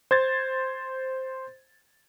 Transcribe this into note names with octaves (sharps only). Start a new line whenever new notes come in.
C5 G#6 A6